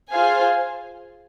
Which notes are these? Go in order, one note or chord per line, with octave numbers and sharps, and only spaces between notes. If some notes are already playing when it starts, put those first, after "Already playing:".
F4 G#4 C5 F5 G#5